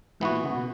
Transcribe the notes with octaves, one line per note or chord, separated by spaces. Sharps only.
G#2 E3 B3 F#4
A#2
C#3
B2